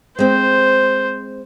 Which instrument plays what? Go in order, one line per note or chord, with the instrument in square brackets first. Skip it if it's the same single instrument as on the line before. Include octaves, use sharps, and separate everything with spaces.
[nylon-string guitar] G#3 C4 [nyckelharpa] C5